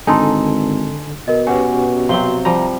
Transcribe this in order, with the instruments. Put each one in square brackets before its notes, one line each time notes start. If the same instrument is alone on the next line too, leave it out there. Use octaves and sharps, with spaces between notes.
[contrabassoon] G#1 [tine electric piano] D3 [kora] D#4 G#4 A4 [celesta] G#5 A5 C6
[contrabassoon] B2 [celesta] A#4 D#5
[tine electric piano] C#4 F#4 G4 [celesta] B4 F#5 G#5
[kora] C3 F#3 C4 [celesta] F5 G7 [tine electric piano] C6
[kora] F3 G3 C5 [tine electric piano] A#5